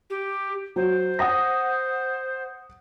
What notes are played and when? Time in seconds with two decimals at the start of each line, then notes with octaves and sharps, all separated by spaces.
0.10 G4
0.76 F#3 C5
1.19 F#5 D#6 A#6